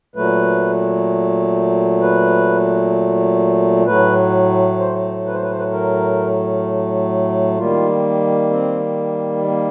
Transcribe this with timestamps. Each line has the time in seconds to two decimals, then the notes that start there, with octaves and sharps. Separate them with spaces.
0.16 A#2 F#3 A3 B4
2.02 B4
3.86 A2 F#3 A3 B4
4.79 C5
5.27 B4
5.34 C5
5.43 B4
5.51 C5
5.59 B4
5.72 A#4
7.58 D#3 G3 A#3 F4
8.50 C4
9.44 A#3